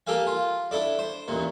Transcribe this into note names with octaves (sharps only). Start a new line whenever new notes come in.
A#3 G4 A4 F5 G#5
F4
D4 E4 A4 D5
C5
A1 D#2 A#2